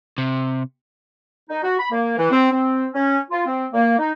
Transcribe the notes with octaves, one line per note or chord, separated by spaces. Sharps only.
C3
D#4
F#4
B5
A#3
E3
C4
C4
C#4
F4
C4
A#3
D#4